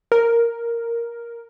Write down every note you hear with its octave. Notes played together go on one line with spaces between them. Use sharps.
A#4